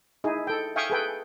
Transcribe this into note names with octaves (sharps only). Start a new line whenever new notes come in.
D#4 E4 G#4
A4 G5
E5 F5 G5 G#5 C#6 D#6
G#4 A4 B4 G5